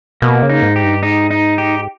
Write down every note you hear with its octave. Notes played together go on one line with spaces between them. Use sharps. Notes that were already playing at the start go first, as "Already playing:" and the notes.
B2 A#3
C#3
D#4
G#2
G4
G2
G#2 D#4
D#4
G4